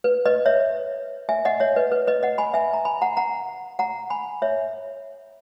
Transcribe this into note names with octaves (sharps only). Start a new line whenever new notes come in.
B4
B4 D#5
C#5 E5
E5 G#5
D#5 F#5
C#5 E5
B4 D#5
B4
B4 D#5
D#5 F#5
G#5 B5
E5 G#5
A#5
G#5 B5
F#5 A#5
F#5 A#5
F#5 A#5
G#5 B5
C#5 E5